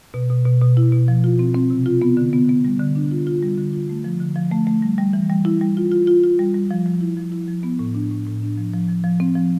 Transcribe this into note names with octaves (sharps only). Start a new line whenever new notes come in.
B2
B2
B2
B2
E4
B2
F3
F4
C4
C4
C3
F4
B3
D3
B3
B3
G3
D3
D4
F4
F4
G3
D3
F4
A3
F3
D3
F3
A3
A3
G3
G3
E3
G3
E4
G3
F4
F4
F4
F4
G3
G3
F3
F3
E4
F3
E4
F3
B3
A2
D4
A2
A2
D4
F3
F3
F3
F3
C4
F3